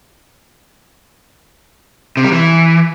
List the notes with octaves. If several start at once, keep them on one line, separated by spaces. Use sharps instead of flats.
C3
G3
E3